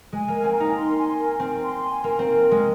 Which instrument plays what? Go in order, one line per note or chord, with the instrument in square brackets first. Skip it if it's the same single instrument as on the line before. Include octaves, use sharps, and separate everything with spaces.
[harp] G#3 [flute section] G#5
[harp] A#3
[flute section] A#4
[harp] C4
[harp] D#4 [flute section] A#4
[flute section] C6
G#5
A#4
[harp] C4 [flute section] A#4
[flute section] C6
G#5
[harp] A#3 [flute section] A#4
[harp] C4
[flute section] A#4
[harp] G#3 [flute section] C6